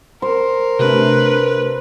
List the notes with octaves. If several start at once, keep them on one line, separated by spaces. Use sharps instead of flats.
A#4 C5
C3 A3 D4 B4